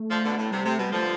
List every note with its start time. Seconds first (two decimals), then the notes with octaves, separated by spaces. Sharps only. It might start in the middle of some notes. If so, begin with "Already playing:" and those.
Already playing: A3
0.11 D3 F3
0.25 B2 D3
0.38 A2
0.52 C3 G3
0.66 C3 A3
0.79 B2 G3
0.92 D3 F3 A3